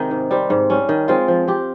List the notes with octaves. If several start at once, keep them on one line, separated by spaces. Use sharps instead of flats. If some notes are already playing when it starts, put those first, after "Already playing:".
Already playing: C3 D#3 G#3 D#4
G#2
G3 C4
G#2
G3 C#4
D#3
G#3 C4 F4
F3
C4 G4